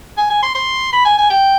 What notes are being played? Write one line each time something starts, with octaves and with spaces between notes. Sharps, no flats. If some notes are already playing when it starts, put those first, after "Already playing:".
G#5
G#5
C6
C6
B5
G#5
G#5
G5